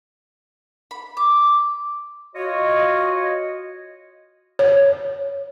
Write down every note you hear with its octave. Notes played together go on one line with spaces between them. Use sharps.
B5
D6
F4 F#4 C#5 D#5
C#5